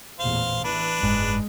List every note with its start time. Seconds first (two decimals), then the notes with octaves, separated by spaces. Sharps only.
0.19 A1 E2 A#2 C5 F5
0.64 E3 D4 B4
1.03 F#1 G#2 G#3